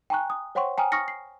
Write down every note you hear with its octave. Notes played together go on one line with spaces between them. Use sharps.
G5 G#5 A#5 C#6 F#6
D#6
C5 C#5 F#5 G5 C6 C#6
G5 G#5 A#5 D#6 F6
C#6 D#6 F6 A#6 C#7
C7